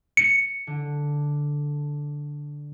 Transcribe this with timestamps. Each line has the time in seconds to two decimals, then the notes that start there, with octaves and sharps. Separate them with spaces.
0.17 C#7
0.67 D3